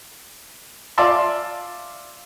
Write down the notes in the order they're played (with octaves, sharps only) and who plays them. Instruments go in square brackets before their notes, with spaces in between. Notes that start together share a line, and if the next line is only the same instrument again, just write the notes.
[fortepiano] F4 D5 E5 A5 C6